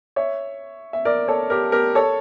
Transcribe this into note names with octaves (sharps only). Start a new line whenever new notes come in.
C#5 E5
E5
A#4 D5
A4 C#5
G4 A#4
G4 A#4
A4 C#5